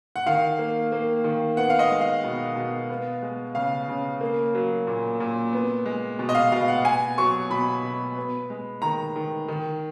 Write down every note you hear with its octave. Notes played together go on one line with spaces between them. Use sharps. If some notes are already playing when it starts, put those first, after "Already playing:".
F#5
D#3 F5
A#3
A#3
D#3
B3 F#5
F5
D#5
G#3
F5
B2
B2
B3
G#3
C#3 F5
C#3
A#3
F#3
A#2
A#2
B3
G#3
B2
D#5
F5
B2 F5
F#5
B3 G#5
F#3 C#6
B2 B5
B2
B3
G#3
D#3 A#5
D#3
D#3